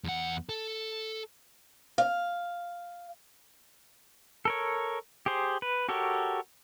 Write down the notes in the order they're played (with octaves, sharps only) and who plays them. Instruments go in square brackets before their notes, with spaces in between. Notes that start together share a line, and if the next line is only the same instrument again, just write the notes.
[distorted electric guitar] E2 F#5
A4
[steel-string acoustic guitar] F5
[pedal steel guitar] A4 A#4 C#5
G4 G#4 C5
B4
F#4 G4 A4 A#4 C#5